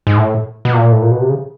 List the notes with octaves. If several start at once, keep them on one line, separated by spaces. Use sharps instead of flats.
G#2
A2
B2
A#2
A2
A#2
B2
C3
C#3